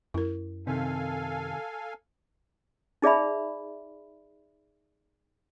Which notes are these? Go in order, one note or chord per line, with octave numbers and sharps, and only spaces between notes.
F#2 E4 A#4
C3 D#3 A4 F5 G#5
D#4 G#4 D5 E5 B5